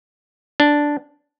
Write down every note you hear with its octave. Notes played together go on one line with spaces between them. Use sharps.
D4